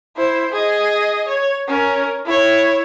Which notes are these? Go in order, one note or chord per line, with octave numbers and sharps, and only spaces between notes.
E4 C5
G#4 D#5
C#5
C#4 A#4
E4 C#5